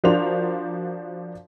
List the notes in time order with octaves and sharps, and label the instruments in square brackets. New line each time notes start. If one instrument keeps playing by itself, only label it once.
[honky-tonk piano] F3 D4 F#4 A#4 C5 F7